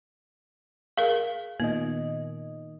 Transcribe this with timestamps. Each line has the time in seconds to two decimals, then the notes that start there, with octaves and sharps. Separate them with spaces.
0.97 G#4 A#4 F5
1.60 A#2 D#3 B3 D#5